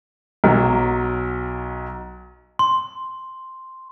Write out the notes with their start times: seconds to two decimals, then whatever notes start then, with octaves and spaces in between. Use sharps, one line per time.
0.44 B1 F#3
2.59 C6